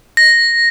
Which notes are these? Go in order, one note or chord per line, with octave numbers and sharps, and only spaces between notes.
A#6